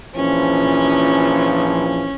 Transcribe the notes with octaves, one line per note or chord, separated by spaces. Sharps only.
A#1 E3 F3 C#4